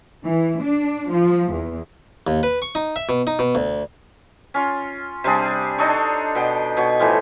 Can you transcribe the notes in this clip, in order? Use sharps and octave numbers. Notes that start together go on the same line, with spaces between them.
E3
D4
F3
E2
D#2
B4
C#6
D#4
E5
B2
D#4
B2
D2
C#4 F4
C3 G3 D4 G#4
D4 D#4 A4 C#5
B2 G5
B2 C#5
A2 E3 F3